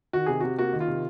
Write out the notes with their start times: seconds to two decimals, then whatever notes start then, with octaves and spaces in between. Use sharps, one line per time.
0.13 D#3 F#4
0.26 C3 G#4
0.40 C3 F#4
0.58 A#3 F#4
0.73 D#3
0.80 F4
0.88 C3